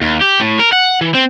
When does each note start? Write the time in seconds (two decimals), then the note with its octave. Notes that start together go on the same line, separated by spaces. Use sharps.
0.01 D#2
0.21 G4
0.40 A2
0.59 A#4
0.72 F#5
1.01 E3
1.15 C4